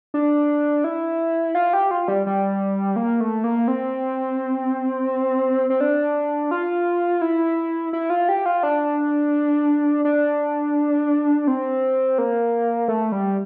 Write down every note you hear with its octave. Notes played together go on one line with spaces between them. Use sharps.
D4
E4
F4
G4
F4
G3
G3
A#3
A3
A#3
C4
C4
D4
F4
E4
E4
F4
G4
F4
D4
D4
C4
A#3
A3
G3